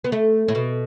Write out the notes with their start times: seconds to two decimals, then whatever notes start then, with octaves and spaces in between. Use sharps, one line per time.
0.04 B3
0.12 A3
0.48 A2
0.55 B2